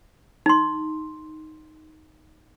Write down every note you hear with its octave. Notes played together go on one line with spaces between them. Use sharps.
D#4 C6